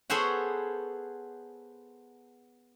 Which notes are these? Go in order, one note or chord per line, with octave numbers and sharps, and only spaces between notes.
B3 G#4 A4 C5 C#5 F#5